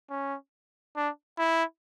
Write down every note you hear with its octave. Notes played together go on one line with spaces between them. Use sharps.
C#4
D4
E4